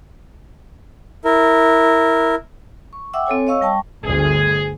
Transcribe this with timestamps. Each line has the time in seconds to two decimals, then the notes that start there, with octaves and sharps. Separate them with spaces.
1.25 E4 A#4
2.93 C#6
3.13 E5 F#5 G5 D6 E6
3.27 C4 A4 C#5 G#5
3.47 C#5 D#5 F5 C#6 E6
3.61 G3 G5 A5 C#6
4.04 G1 D2 G#4